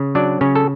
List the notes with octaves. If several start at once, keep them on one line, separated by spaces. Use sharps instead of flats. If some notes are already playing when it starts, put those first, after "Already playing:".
Already playing: C#3
F#3 D4 D5
C#3 C#4 C#5
A4